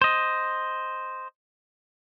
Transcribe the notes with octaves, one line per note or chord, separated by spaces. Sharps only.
C5 D#5